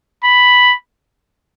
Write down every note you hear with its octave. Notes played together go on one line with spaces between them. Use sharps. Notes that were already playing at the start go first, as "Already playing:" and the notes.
B5